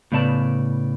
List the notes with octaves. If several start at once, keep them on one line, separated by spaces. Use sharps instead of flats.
A2 C#3 B3 D5 A5